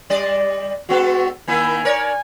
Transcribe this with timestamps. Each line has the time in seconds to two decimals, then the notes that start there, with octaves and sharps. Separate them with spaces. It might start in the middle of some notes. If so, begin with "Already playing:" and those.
0.10 G3 D5 D#5
0.89 G#3 B3 F#4 A4
1.48 D#3 A#3 E4 G#5
1.85 A#4 C#5 D5